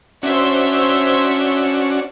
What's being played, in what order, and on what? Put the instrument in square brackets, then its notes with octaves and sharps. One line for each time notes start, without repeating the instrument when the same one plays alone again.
[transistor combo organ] C#4 D4 F#4 [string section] C5 C#5 E5